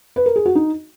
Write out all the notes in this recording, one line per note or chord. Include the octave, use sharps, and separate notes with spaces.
B4
A#4
G#4
F#4
D#4